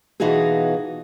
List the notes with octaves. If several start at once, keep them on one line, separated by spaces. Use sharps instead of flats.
B2 E3 D#4 F4 F#4 G#4